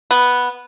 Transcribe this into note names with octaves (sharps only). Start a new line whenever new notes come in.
B3